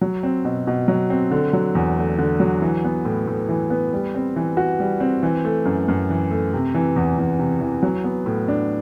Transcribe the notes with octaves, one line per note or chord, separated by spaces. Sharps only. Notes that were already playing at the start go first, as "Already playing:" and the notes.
F#3
C4
B2
B2
F#3
C4
D3
F#3
E2
A3
D3
F#3
E3
B3
A2
A2
E3
B3
G3
C4
E3
F#4
G3
C4
E3
A3
F#2
F#2
E3
A3
C3
E3
E2
E2
C3
E3
F#3
B3
A2
D4